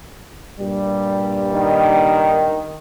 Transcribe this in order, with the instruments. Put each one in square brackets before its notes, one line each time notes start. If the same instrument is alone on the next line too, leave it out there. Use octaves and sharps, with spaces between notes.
[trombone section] G2 A#2 G3
[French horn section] D#3